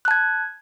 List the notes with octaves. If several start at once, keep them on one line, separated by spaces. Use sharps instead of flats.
A5 F#6 G#6